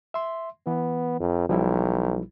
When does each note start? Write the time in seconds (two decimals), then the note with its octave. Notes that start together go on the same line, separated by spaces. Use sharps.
0.14 E5 C6
0.67 E3 B3
1.20 F2
1.49 B1 F3 G3 E4